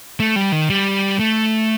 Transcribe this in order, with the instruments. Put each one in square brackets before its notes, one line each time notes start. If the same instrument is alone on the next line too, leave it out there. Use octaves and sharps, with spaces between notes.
[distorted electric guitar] A3
G3
D#3
G3
A3